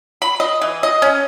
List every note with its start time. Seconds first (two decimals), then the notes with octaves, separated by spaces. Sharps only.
0.22 B5
0.40 D#5
0.62 E3
0.83 D#5
1.02 C#4